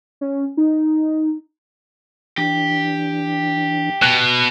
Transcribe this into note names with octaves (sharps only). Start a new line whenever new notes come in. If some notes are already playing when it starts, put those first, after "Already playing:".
C#4
D#4
E3 D4 G4
B2 F#6